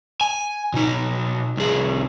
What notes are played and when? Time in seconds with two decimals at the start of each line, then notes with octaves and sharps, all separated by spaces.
0.21 G#5
0.74 B2 D#4
1.57 C2 G#4